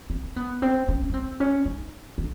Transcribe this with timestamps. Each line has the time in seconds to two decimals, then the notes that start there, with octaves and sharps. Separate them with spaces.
0.10 C4
0.36 B3
0.62 C4
0.88 C#4
1.09 C#4
1.14 C4
1.40 C#4
1.65 D#4
2.18 D4